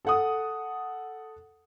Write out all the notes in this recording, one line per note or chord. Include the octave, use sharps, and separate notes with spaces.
A4 F#5 D#6